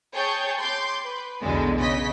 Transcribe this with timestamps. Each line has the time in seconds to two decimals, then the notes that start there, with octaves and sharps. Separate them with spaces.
0.14 G#4 C#5 G5 A5 C#6 G6
0.60 C6 D6 G6
1.03 B4
1.41 B1 E2 B2 D3 G#3
1.78 C#3 D#5 B6